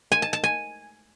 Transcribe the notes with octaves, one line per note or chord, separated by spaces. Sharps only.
G#5
A5
A5
G#5